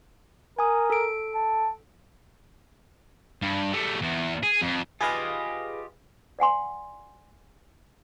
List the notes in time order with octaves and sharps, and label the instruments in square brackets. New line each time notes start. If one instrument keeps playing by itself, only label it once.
[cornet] A#4 [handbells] G#5 D#6
[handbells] A4 D7
[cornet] A5
[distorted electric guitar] G2
G3 A3
E2
G#4
F2
[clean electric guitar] F4 G4 D#5 [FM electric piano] G#4 B4 F5
[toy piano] D5 F#5 G#5 C6